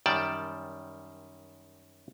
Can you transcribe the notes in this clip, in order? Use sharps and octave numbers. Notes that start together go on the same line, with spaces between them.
F#2 D#3 G3 D5 G5 A5